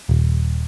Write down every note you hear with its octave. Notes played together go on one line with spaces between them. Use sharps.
D#1